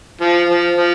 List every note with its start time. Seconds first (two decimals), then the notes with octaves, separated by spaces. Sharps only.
0.21 F3
0.49 F3
0.77 F3